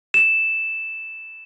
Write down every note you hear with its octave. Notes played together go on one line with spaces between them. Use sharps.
E7